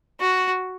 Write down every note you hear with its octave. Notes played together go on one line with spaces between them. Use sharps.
F#4